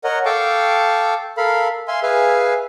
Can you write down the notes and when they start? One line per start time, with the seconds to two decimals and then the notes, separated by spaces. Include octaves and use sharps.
0.04 A#4 C#5 D#5 F#5
0.25 A4 F5 G5 A5 C#6 D6
1.37 A4 A#4 F5 B5
1.88 E5 F5 G#5 C6
2.03 G#4 B4 E5 F5 G#5